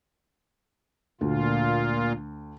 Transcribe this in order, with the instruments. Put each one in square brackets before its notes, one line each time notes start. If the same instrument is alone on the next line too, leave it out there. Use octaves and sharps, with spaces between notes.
[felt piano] D2 [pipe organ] A#2 F4